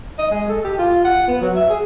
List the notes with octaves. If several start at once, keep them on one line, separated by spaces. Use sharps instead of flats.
D#5
G#3
A4
G4
F4
F#5
B3
F#3
E5
G#4